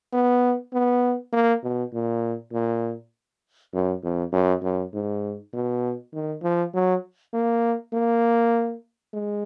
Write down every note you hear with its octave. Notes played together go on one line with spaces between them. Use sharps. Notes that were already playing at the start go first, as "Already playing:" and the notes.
B3
B3
A#3
B2
A#2
A#2
F#2
F2
F#2
F#2
G#2
B2
D#3
F3
F#3
A#3
A#3
G#3